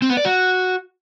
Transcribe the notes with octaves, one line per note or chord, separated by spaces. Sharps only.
C4
B3
D5
F#4